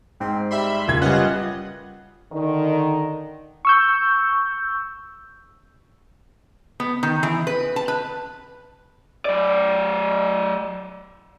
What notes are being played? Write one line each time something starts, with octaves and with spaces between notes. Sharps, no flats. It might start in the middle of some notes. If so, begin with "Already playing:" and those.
G#2 C4
G3 E5 B5 C6
F#1 F4 G#6
G3 B3 C#4 F4 D#5 F#5 F#6
D3 D#3
C#6 E6 G6
B3
D#3
E3
B4
A5
B4
F#3 D5